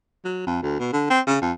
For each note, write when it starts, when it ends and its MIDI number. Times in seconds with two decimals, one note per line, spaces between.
0.24 0.44 54
0.46 0.58 41
0.62 0.75 38
0.79 0.89 47
0.93 1.06 50
1.10 1.20 60
1.27 1.40 49
1.41 1.52 41